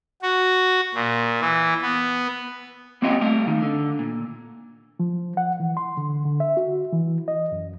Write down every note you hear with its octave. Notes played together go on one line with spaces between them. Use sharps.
F#4
A#2
E3
B3
A#3 C4 C#4 G4 D#5 F5
G3 A3 F5
D#3
D3
A#2
F3
F#5
E3
C6
D3
D3
E5
F#4
E3
D#5
F#2